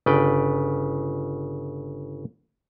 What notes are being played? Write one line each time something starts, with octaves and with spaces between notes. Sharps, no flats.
G1 C#3 B4 D5 G5